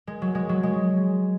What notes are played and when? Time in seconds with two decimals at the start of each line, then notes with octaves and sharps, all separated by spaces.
0.07 G#3
0.22 F#3
0.35 G#3
0.49 F#3
0.63 G#3